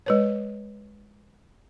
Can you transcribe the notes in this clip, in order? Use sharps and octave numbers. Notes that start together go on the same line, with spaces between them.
G#3 B4 C#5